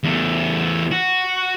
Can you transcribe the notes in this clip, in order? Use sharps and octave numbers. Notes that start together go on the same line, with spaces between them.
E2 A3
F#4